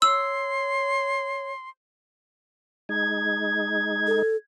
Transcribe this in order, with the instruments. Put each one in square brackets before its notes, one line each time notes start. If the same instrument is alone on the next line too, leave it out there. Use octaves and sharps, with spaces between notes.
[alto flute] C#5 [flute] C6 [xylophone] E6
[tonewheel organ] G#3 D#4 [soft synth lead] G#6
[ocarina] A4